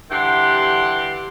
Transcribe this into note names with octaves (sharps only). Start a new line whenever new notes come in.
G2 D3 E3 G4 F#5 C6